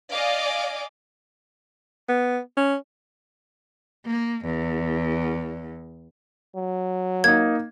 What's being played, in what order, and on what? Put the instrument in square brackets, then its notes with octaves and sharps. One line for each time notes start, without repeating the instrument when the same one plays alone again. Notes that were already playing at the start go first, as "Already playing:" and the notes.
[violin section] D5 D#5 F5 G#5 D6
[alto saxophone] B3
C#4
[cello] A#3
E2
[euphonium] F#3
[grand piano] A#3 D#4 [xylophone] G#6